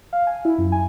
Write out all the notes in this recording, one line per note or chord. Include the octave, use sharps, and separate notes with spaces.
F5
G#5
E4
F#2
G#5